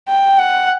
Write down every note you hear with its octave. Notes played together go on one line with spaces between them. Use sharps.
G5
F#5